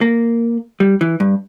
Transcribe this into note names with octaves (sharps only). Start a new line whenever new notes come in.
A#3
G3
E3
G2